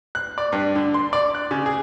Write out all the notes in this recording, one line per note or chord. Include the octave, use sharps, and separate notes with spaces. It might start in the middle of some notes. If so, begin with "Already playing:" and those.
F#6
D5
G2
D3
C6
D5
F#6
C#3
G#4